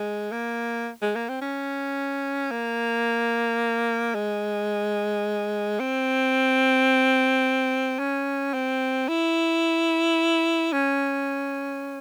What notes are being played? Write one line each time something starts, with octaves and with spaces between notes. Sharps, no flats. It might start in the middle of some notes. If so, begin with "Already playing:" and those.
Already playing: G#3
A#3
G#3
A#3
C4
C#4
A#3
G#3
C4
C#4
C4
E4
C#4